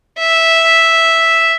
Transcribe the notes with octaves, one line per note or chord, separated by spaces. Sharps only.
E5